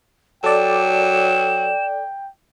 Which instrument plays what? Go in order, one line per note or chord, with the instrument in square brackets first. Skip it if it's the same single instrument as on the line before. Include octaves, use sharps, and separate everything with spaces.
[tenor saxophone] F#3 [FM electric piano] A4 D5 [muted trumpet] G5 [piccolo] E7